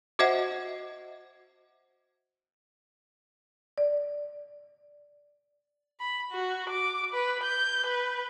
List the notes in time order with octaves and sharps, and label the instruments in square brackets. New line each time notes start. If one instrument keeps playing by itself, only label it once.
[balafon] F#4 C5 D#5 E5 F#5
[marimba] D5
[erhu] B5
F#4
D6
B4
G6
B4